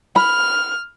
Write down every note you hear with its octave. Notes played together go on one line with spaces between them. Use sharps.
B5 F6